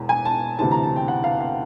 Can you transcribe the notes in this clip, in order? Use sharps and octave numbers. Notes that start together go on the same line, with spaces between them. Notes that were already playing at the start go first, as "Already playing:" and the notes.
Already playing: E1 E2
G#5
A5
D2 C3 E3 A5
A#5
A5
G5
F#5
F5
F5